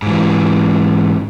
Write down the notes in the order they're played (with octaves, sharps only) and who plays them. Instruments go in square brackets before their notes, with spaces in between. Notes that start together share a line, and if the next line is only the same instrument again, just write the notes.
[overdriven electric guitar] G#2 E3